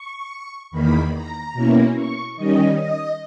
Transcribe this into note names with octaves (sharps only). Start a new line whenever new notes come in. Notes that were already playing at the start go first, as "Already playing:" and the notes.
Already playing: C#6
E2 D#3 A#3 B5
A#5
B2 A#3 C#4 E4
C#6
D#3 G3 C#4 D#5
D#5